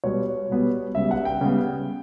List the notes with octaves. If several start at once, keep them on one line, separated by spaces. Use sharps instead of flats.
B2 G3 B3 C#5
B2 G3 B3
C#3 G3 B3 E5
F#5
G5
C#3 G3 B3